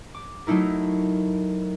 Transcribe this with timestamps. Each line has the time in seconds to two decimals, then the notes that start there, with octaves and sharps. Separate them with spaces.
0.14 D6
0.47 F#3 A3 D#4 E4 A#4